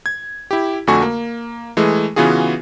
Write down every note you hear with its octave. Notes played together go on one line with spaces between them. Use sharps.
G#6
E4 G4
F2 D3 A3 F#4 G#5 C#6
A#3
E3 G#3 A3 G#4
C#3 E3 B3 F4 F#4 G#4